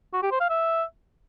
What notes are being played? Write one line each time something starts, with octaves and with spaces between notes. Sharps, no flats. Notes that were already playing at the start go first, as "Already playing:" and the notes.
F#4
G4
C5
F5
E5